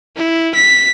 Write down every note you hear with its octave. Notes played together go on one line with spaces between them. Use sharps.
E4
B6